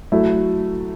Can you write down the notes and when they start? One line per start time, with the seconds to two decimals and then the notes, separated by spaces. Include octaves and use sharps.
0.12 F#3 A3 E4